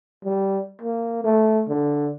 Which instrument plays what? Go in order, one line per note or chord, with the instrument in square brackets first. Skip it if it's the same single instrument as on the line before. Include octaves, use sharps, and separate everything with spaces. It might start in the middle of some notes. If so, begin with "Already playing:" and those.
[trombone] G3
A#3
A3
D3